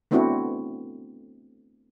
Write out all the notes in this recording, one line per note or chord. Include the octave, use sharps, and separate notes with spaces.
A3 B3 C4 D4 E4 F#4